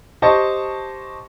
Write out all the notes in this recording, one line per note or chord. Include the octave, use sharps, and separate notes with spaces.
G4 C5 D#5 A5 C#6